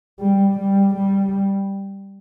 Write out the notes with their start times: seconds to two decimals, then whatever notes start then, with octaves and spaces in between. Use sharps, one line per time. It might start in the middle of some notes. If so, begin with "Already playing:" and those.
0.20 G3
0.58 G3
0.95 G3